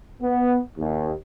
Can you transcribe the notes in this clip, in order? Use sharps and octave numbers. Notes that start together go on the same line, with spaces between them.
B3
D#2